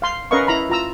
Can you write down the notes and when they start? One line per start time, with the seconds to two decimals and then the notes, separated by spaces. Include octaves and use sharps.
0.02 F5 C6
0.31 C#4 A#4 B4 D#5 F5 C#6
0.47 E4 A#5 B5
0.70 F4 A#5 E6